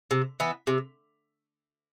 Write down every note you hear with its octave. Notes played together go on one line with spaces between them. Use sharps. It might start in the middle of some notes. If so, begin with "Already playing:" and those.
C3
E3 B3
C3